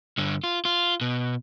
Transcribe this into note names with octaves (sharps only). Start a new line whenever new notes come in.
G2 D3
F4
F4
B2